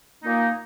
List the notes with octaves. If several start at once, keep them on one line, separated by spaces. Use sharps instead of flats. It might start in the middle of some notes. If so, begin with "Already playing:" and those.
A#2 A#3 D#4